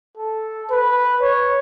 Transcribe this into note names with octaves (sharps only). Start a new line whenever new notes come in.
A4
B4
C#5